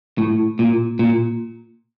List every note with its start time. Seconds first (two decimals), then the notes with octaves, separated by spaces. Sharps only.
0.18 A2
0.59 A#2
0.99 A#2